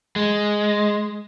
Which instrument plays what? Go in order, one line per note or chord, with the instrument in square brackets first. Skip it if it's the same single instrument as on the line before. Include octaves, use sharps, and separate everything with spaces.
[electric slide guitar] G#3